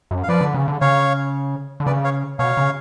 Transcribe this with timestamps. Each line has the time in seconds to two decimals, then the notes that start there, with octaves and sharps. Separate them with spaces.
0.11 F#2
0.23 F5
0.29 F3 B4 D5
0.41 D3
0.54 C#3
0.68 D3
0.81 C#3 C#5 F5
1.80 D3
1.86 C#3 B4 D5
2.04 C#5 F5
2.39 B2 C#5 F5
2.57 C#3